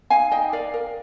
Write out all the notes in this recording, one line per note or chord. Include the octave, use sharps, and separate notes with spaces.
D#4 F5 G#5
D#4 D#5 G5
A#4 D5 F5
A#4